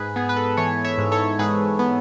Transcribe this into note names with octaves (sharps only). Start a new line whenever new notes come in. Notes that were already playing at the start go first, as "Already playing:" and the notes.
Already playing: G#2 G#4 B4
B3 G#4
B4
A4
E3 A4 C#5
C#5 E5
G#2
A4 C#5
G#2 G#4 B4
B3